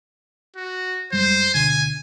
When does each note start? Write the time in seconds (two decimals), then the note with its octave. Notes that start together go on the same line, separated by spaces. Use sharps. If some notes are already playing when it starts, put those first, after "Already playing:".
0.56 F#4
1.12 F#1 G3 G#3 C5
1.54 D2 B2 D3 G#5